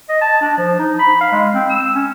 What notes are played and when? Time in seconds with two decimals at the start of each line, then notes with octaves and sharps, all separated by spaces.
0.09 D#5
0.21 A5
0.41 D4
0.58 F3
0.79 D#4
0.99 B5
1.21 F5
1.32 G#3
1.54 C4
1.70 E6
1.95 C#4